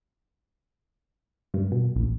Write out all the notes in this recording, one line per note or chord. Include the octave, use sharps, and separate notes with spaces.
G2
B2
A#1